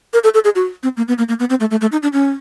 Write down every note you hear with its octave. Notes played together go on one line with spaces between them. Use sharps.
A#4
A4
A4
G#4
F#4
C4
A#3
B3
A#3
A#3
B3
C4
A3
A3
A3
D#4
D4
C#4